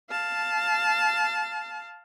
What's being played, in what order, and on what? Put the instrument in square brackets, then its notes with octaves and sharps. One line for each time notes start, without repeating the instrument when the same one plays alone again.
[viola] F5 A5